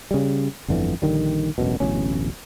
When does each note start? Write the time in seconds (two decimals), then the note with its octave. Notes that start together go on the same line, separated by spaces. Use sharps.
0.11 C#3 G3
0.68 G1 F2 D3 E3
1.02 A#1 D3 D#3 G3
1.58 E1 A1 F#2 B2
1.80 D1 A1 B2 C#4